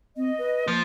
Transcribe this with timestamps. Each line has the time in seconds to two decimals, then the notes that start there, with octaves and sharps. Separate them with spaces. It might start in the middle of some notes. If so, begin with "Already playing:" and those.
0.16 C4 D#5
0.38 B4
0.68 F3 A#3